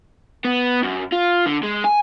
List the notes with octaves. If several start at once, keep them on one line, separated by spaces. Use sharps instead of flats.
B3
F#2
F4
D3
G#3
G#5